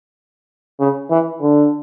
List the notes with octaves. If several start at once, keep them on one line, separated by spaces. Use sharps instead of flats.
C#3
E3
D3